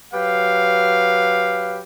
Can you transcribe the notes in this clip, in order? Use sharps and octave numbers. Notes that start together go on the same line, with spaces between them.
F#3 G4 B4 F5